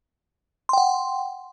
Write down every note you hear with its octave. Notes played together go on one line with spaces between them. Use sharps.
F#5 G5 C6